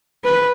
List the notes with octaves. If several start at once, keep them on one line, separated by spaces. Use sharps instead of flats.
B4